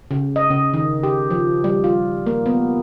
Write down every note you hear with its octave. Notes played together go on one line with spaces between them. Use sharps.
C#3
D#5
C#3
D#3
G4
F3
G3
F4
A#3
B3